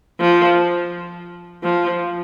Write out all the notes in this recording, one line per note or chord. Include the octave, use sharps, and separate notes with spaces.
F3
F3